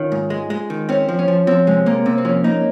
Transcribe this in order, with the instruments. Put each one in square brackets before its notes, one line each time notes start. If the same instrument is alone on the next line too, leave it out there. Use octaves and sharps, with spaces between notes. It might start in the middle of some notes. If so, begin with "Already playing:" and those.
Already playing: [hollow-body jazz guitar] D#3 [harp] C#4 F4
[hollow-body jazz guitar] G#2
G#3
G#3
D#3
[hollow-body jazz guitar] C4 [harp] C#4
[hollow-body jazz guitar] F3
[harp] C#4
[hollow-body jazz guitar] F3
[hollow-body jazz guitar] F3 [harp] C4
[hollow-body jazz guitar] C3 [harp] G#3
[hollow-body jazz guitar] C3 [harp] A#3
[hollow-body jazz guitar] C3 [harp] C4
[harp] C4
[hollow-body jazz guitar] F3 [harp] C#4
[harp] A#3 [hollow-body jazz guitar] D#4